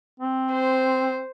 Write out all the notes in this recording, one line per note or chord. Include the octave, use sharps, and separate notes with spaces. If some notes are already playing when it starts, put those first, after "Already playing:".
C4
C5